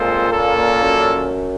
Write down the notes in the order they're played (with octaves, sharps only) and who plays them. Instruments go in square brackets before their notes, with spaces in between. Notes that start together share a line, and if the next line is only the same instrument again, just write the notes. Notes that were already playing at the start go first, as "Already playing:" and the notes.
Already playing: [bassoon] A#2 [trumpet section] G#3 C4 F4 A4 C5
[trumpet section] A#3 C#4 F4 A4 D5
[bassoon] F#2